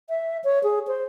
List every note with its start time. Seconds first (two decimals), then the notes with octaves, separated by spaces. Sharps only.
0.09 E5
0.44 C#5
0.63 G#4
0.88 C5